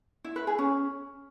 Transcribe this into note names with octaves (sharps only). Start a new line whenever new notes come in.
E4
B4
G#4
C#4